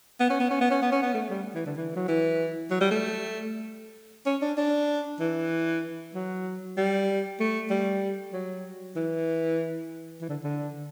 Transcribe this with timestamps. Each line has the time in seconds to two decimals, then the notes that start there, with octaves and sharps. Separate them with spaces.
0.20 B3
0.30 C#4
0.40 B3
0.50 C#4
0.61 B3
0.71 C#4
0.82 B3
0.92 C#4
1.02 B3
1.14 A3
1.30 G3
1.55 E3
1.66 D3
1.76 E3
1.96 F#3
2.08 E3
2.71 F#3
2.81 G3
2.91 A3
4.26 C#4
4.42 D4
4.58 D4
5.20 E3
6.15 F#3
6.77 G3
7.40 A3
7.70 G3
8.33 F#3
8.96 E3
10.21 E3
10.29 D3
10.44 D3